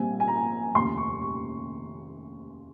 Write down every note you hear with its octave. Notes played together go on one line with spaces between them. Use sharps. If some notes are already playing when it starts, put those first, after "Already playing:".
Already playing: A#1 A#2 G3 C4 G#5
G#5
A#5
F1 D#2 C#3 C6
C#6
C#6